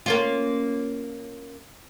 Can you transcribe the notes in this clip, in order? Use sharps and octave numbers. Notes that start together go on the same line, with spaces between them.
A#3 C#4 F4